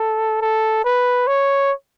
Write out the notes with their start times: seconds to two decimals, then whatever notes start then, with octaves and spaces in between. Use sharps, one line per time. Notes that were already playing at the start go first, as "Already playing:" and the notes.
Already playing: A4
0.42 A4
0.85 B4
1.27 C#5